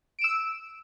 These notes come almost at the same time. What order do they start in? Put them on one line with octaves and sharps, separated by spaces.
D7 E7 E6